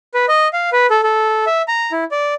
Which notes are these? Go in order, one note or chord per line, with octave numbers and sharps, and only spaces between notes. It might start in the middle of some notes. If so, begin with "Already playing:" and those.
B4
D#5
F5
B4
A4
A4
E5
A#5
E4
D5